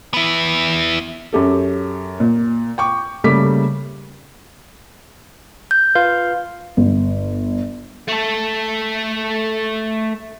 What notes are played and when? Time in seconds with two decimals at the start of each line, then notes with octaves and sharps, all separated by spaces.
0.14 B3 E4
1.33 F#2 G4 A4
2.20 A#2
2.78 G5 C#6 D6
3.24 C#3 G3 A3 A#3 D6 B6
5.71 G6
5.95 F4 B4 F5 G6
6.77 G1
8.09 A3 A4